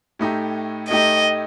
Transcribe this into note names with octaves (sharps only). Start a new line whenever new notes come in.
A2 A3 D#4 G4
A2 A3 D#4 G4 D#5